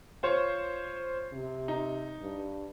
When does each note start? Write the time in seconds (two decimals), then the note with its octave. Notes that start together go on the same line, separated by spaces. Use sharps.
0.23 F4 C5 C#5
1.33 C3
1.68 D#4
2.21 G2